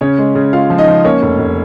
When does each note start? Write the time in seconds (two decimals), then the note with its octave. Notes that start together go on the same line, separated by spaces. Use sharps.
0.01 C#3 C#4 C#5
0.18 G#3
0.35 C#3
0.53 G#3 F4 F5
0.70 F3
0.78 D#4 D#5
0.88 F3
1.04 A#3 C#4 C#5
1.22 F1
1.39 F1